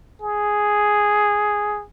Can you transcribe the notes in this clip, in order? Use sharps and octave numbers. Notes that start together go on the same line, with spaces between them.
G#4